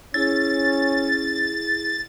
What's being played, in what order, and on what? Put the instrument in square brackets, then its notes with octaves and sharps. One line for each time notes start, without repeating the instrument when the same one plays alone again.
[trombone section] C#4 [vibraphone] E4 G#4 [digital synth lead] A6